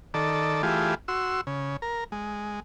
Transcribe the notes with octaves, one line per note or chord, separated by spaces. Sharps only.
D#3 A4 D5
E3 A3 F4 G4 G#4
F#4 C6 E6
C#3
A#4
G#3